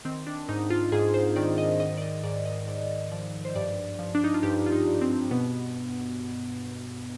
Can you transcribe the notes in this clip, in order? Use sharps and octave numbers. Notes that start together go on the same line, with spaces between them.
D#3 C4
D4
G#2 D#4
F4
G#2 G#4
C5
D#3 D5
D#5
G#2 D#5
D5
D#5
G#2 D5
D#5
G#2 D5
F3 D5
C5
G2 D5
F3
D4
D#4
F4
G2 G4
F4
D#4
G2
C4
B2 B3